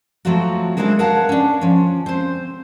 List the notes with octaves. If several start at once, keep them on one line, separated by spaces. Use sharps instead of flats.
F3 F#3 A3 C4 F4 F#4
G#3 A#3 C4 D4 E4 A4
A#4 B4 C#5 F5 F#5 A5
C#4 D4
F3 C#4
C4 C5